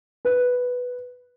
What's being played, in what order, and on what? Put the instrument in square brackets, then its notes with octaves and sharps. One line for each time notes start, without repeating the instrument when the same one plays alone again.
[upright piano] B4